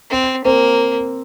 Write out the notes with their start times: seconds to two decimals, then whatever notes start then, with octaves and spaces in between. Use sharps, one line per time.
0.10 C4
0.45 A#3 C4